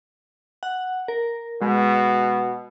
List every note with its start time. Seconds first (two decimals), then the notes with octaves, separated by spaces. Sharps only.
0.63 F#5
1.08 A#4
1.62 B2 G#3